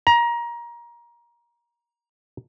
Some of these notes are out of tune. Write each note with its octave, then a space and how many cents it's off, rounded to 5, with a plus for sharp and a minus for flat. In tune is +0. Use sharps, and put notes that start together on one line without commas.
A#5 +25